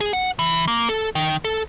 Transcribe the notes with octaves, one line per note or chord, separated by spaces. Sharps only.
G#4
F#5
E3
A#3
A4
D#3
A4